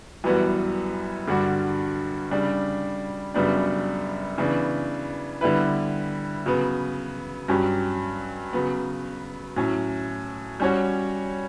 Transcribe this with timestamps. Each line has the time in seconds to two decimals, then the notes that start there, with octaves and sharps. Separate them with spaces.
0.24 F#2 E3 G3 B3 F#4
1.27 G2 D3 G3 D4 F#4
2.31 C#3 G3 D4
3.34 F#2 C#3 G3 B3 D4
4.38 C#3 E3 B3 D4
5.41 D3 G3 B3 E4 B4
6.46 C#3 F#3 B3
7.48 G2 F#3 C#4 G4
8.53 C#3 F#3 B3
9.56 A2 F#3 C#4
10.60 G3 C#4 F#4 C#5